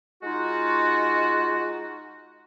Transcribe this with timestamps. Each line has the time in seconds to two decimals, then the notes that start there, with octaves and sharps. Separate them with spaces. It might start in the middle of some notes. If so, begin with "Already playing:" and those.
0.23 G#3 D#4 F4 F#4